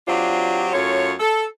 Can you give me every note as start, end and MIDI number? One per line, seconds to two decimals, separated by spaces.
0.08 0.69 54
0.08 0.69 60
0.08 0.69 62
0.08 0.69 65
0.08 0.69 67
0.72 1.12 42
0.72 1.12 57
0.72 1.12 65
0.72 1.12 73
1.19 1.44 69